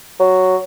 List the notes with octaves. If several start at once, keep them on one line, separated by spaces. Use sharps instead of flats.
F#3